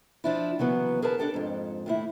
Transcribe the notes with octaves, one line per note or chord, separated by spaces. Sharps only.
F3 D4 E4
C#3 E3 F#3 B3
G#4 A#4 B4 A5
D4 G4 A4 G5
F2 G#2
D#2 A2 E4